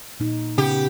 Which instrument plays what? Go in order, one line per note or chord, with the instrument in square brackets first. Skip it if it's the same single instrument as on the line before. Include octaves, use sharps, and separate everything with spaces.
[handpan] A#2 D#4
[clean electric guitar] C#3 B3 [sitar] G4